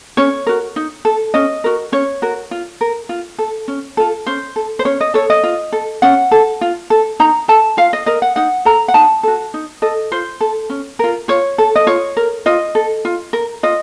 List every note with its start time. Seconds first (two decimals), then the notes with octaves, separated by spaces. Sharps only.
0.17 C#4 C#5
0.47 F#4 A#4
0.76 D#4
1.05 A4
1.34 C#4 D#5
1.64 F#4 A#4
1.92 C#4 C#5
2.22 F#4 A#4
2.51 F4
2.81 A#4
3.09 F4
3.39 A4
3.68 C#4
3.97 F4 A4
4.27 C#4 C5
4.56 A4
4.79 C5
4.85 C#4 C#5
5.01 D#5
5.14 A4 C#5
5.30 D#5
5.43 F4
5.72 A4
6.02 C#4 F#5
6.31 A4
6.61 F4
6.90 A4
7.20 D#4 A#5
7.48 A4 A5
7.77 F4 F5
7.93 D#5
8.06 A#4 D#5
8.22 F#5
8.36 D#4 F#5
8.65 A4 A#5
8.88 F#5
8.94 D#4 A5
9.23 F#4 A4
9.54 D#4
9.82 A4 D#5
10.12 F4 C5
10.41 A4
10.70 C#4
10.99 F4 A#4
11.28 F4 C#5
11.58 A4
11.76 D#5
11.87 F4 C#5
12.17 A#4
12.46 F4 D#5
12.75 A4
13.05 F4
13.33 A#4
13.63 F4 D#5